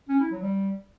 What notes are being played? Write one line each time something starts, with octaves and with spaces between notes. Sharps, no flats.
C#4
E4
F#3
G3